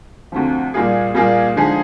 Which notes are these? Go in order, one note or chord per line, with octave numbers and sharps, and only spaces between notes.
D2 C3 F3
A#2 G3 A#3 F4 G#4
A#2 G3 A#3 F4 G#4
D3 F3 G#3 D#4 G#4